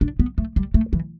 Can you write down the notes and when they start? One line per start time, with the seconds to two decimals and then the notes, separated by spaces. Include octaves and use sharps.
0.01 D4
0.19 B3
0.38 A3
0.56 G3
0.74 A3
0.93 E3